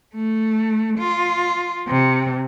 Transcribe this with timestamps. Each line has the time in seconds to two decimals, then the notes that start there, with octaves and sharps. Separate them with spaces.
0.15 A3
0.99 F4
1.88 C3